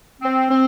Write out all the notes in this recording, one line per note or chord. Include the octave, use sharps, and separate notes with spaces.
C4
C4